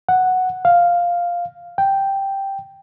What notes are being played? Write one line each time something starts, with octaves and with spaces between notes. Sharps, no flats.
F#5
F5
G5